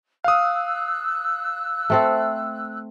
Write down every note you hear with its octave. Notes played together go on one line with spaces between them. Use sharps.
F5 D#6 E6 F#6
A3 C4 A4